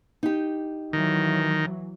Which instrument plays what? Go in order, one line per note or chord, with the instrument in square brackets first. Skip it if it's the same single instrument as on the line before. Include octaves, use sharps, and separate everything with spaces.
[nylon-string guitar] D#4 G4
[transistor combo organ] D#3 [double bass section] E3 F#3